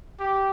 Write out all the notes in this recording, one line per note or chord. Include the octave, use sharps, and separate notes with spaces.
G4